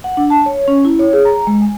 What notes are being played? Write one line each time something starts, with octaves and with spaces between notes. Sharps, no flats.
F#5
D4
A5
C#5
C#4
E4
C#5
G#4
A#5
G#3
G#5